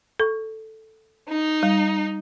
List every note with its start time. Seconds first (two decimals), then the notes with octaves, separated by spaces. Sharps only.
0.20 A4 C#6
1.29 D#4
1.63 G3